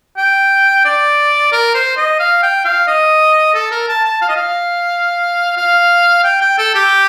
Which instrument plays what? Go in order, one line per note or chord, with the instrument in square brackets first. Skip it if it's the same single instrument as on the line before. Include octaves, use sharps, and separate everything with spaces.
[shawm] G5
D5
A#4
C5
D#5
F5
G5
F5
D#5
A4
A#4
A5
A5
F5
D#5
F5
F5
G5
G5
A4
G4